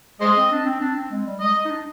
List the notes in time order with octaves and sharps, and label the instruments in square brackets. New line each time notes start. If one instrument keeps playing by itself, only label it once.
[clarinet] G#3 [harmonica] G#4 C5 D#5
[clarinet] C4
D4
C4
D4
C4
G#3
G3
[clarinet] G#3 [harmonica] D#5
[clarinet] D#4
D4